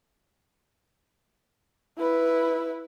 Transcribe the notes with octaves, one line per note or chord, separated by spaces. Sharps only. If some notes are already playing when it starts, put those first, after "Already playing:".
E4 B4